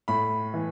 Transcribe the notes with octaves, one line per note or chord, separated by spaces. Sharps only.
A2 B5
E3